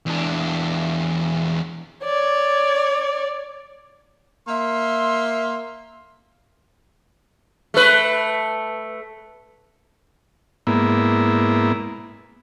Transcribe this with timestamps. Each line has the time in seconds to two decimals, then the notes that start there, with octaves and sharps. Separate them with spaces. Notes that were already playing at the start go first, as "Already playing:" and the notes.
0.06 E2 D4
2.04 C#5 D5
4.48 A#3 E5 C6
7.74 A3 B4
10.67 G#2 A#3 B3 E4